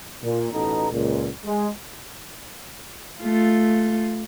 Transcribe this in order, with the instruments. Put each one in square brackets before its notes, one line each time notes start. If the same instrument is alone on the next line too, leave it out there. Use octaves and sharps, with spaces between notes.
[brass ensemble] A#2
A1 B2 B3 D#4 A4 A#5
C#2 A#2
G#3
[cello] A3 F4